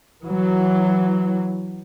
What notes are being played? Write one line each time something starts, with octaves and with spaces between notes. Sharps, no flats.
E3 F#3